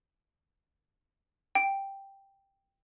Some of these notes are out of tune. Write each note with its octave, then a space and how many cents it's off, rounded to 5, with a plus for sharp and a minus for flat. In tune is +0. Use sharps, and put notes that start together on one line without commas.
G5 +0